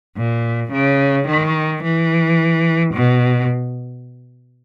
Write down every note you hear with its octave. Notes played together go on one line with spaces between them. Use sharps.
A#2
C#3
D#3
E3
B2